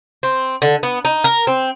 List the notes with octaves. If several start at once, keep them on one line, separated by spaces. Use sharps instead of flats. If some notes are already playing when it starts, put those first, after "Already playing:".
C4
D3
B3
D#4
A#4
C4